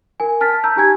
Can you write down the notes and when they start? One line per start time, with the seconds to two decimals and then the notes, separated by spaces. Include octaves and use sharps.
0.20 A#4 G#5
0.41 A5 F6 A6 B6
0.64 A5 A#5 E6 G6
0.76 D#4 G4 G#5 G#6